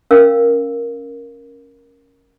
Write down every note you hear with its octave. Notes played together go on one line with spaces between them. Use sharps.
C#4 A#4 F5 E6